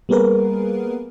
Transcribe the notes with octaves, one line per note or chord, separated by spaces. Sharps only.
G3 A#3 B3 G#4 A#4 B4